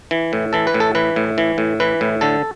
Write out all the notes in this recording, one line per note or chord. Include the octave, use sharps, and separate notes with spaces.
E3
A2
E3 A4
B4
A2
A4
E3 B4
A2
E3
A2
E3 B4
A2
D3 A4